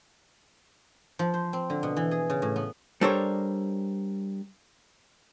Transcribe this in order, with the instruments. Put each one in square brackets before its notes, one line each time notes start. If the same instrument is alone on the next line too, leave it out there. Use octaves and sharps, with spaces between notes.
[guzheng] F3
C5
C4
D3
B2
E3
G#4
C#3
A2
B3
[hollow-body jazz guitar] G3 D4 A4 A#4 C5 C#5